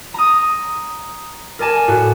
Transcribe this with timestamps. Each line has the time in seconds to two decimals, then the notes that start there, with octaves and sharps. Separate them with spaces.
0.14 A#5 D#6
1.59 A#4 D5 G#5 A5
1.88 A2 F#4